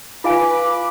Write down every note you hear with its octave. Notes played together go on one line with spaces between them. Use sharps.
F4 B4 F5 G#5 D6